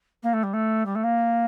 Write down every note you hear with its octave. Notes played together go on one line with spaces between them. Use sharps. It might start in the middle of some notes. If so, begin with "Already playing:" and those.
A#3
A3
G3
A3
G3
A3
A#3